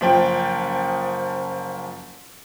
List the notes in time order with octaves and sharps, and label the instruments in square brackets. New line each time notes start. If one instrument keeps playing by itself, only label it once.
[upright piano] F#1 F3 G5